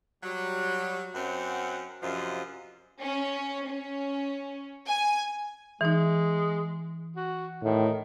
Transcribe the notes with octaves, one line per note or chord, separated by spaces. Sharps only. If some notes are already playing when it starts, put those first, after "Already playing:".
F#3 G3
F#2 C4 C#4 F#5
F#2 C3 F3 F4 D#5
C#4
C#4
G#5
E3 G#3 D#4
F#4
A2 D#3